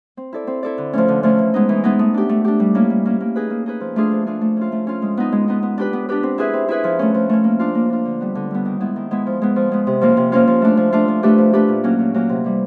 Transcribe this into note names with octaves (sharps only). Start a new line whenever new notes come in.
C4
E4 A4 D5
C4
E4 A4 D5
D3
F3 A3 C#4
D3
F3 A3 C#4
E3
G#3 B3 D#4
E3
G#3 B3 D#4
A3
D4 G4
A3
D4 G4
G3
A#3 C#4 E4
G3
A#3 C#4 E4
A#3
D#4 G#4 B4
A#3
D#4 G#4 B4
F3
A3 D4 F4 G#4
F3
A3 D4 F4 G#4
A3
C#4 F4
A3
C#4 F4
G#3
B3 D#4
G#3
B3 D#4
B3
D4 G4 B4
B3
D4 G4 B4
C4
E4 G#4 B4 E5
C4
E4 G#4 B4 E5
F3
A3 C#4
F3
A3 C#4
A#3
D4 F4
A#3
D4 F4
D3
G3 B3
D3
G3 B3
D#3
G#3 B3 E4
D#3
G#3 B3 E4
F3
G#3 B3
F3
G#3 B3
C3
F3 A#3 C#4 F4
C3
F3 A#3 C#4 F4
F3
A3 D4 F4
F3
A3 D4 F4
F3
A3 D4 G4 B4
F3
A3 D4 G4 B4
A#2
F#3 A#3 C#4
A#2
F#3 A#3 C#4
C3
E3 G3